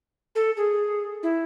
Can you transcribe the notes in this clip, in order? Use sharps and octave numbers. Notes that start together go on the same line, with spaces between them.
A4
G#4
E4